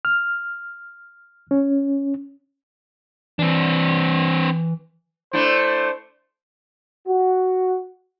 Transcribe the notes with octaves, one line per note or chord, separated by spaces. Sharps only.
F6
C#4
E3 C4 D4
A3 D4 E4 C5
F#4